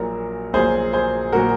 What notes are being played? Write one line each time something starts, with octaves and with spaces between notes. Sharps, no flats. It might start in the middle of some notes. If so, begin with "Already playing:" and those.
Already playing: A#1 A#2 F#3 A#4
A#1 A#2 F#3 G#4 C5
G#4 C5
A#2 F#3 F#4 A#4